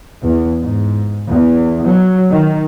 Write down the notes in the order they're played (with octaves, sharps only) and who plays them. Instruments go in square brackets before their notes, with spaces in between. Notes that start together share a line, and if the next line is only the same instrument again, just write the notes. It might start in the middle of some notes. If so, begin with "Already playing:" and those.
[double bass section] E2
G#2
E2
F#3
D#3